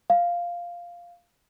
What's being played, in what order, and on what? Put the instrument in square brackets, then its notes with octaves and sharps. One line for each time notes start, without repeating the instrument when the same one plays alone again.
[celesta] F5